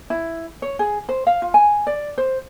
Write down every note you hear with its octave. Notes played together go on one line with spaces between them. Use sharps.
E4
C#5
G#4
C5
F5
F4
G#5
D5
C5